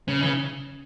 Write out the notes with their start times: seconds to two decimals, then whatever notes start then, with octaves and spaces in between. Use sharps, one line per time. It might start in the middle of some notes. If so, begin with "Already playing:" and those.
0.08 C#3
0.22 E3
0.26 C#3